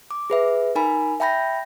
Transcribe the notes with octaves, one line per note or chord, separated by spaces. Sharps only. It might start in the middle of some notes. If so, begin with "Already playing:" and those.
D6
G#4 B4 E5
D#4 A#4 G#5 B5
E5 G5 A5 B5 G6 A#6